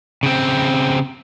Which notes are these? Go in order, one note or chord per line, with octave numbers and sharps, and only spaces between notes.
C#3 C4